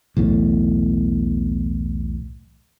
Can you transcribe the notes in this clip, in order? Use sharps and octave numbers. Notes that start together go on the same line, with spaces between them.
B1 E2 A2